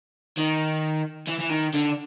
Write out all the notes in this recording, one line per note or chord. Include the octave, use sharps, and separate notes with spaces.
D#3
E3
E3
D#3
D3